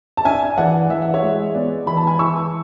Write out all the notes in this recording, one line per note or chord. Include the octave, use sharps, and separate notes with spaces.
A5
D4 E5 G#5
E3 D5 F#5
E3 E5
F#5
C#5 E5
G#3
B3 B4 D5
E3 B5
A5
G#5 B5
E3 C#6 E6